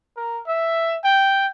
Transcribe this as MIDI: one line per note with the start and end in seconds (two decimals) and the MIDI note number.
0.17 0.39 70
0.47 0.96 76
1.04 1.47 79